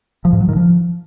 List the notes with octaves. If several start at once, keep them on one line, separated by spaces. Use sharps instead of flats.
F3
G#2
F#3
D#3
F3